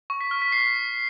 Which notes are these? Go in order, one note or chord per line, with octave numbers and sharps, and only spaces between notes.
C#6
B6
F6
B6
C7